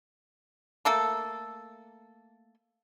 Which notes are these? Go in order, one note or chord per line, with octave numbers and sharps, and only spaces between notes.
A3 A#3 A4